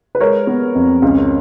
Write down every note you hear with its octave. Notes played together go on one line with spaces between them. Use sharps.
B4
G#3 A#4 C#5
B3
F2
C#2